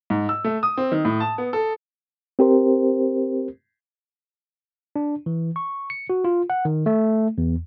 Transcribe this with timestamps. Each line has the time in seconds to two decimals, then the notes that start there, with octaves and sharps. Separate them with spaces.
0.10 G#2
0.29 E6
0.44 A3
0.63 D#6
0.77 C4
0.92 D#3
1.05 A2
1.20 A5
1.38 B3
1.53 A4
2.39 C4 G4 A#4 C5
4.96 D4
5.26 E3
5.56 C#6
5.90 C#7
6.10 F#4
6.24 F4
6.50 F#5
6.65 D#3
6.86 A3
7.38 E2